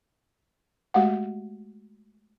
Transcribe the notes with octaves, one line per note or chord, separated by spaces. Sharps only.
G#3 A3 F#4 G4 F5 F#5